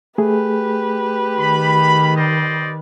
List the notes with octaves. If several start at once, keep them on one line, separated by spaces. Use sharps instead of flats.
A3 G4 G#4 B4
D#3 B5
C5 D5 D#5